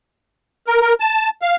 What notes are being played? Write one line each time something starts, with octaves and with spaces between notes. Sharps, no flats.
A#4
A#4
A5
F5